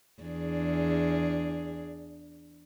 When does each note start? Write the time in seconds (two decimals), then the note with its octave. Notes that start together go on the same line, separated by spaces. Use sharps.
0.22 E2 D4 G#4